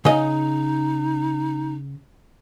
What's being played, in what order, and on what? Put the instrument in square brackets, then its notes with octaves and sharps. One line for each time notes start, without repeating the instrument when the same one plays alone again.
[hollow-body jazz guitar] C#3 D#5 [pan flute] D#4